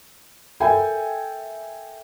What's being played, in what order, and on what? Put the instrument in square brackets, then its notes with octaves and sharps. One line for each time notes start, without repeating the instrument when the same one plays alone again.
[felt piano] A4 A#4 E5 G5 G#5